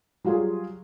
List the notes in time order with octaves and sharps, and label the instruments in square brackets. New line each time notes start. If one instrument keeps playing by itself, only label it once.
[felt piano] F#3 G3 F4 F#4 G#4